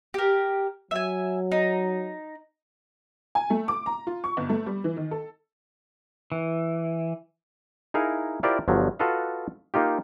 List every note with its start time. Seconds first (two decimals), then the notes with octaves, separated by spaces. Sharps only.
0.14 G4 A#4
0.91 F#3 E5 G#5
1.52 D#4
3.35 G#5
3.50 A3
3.68 D6
3.86 A#5
4.07 F4
4.24 C#6
4.37 G1
4.49 A3
4.66 G3
4.84 E3
4.97 D#3
5.11 A4
6.32 E3
7.94 D#4 E4 G#4 A#4 F5
8.43 E4 F4 G4 A#4 C5 D5
8.68 G1 G2 F3 F#3
8.99 F4 F#4 A4 B4 D#5 F5
9.74 A#3 D#4 F4 G4